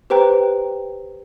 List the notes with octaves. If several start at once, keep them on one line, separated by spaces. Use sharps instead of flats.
G4 B4 C5 G5 A#5